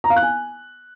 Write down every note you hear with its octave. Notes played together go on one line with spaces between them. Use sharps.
A#5
F5
F#6
G#5